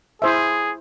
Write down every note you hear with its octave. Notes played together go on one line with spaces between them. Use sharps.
E4 G#4 C5 E5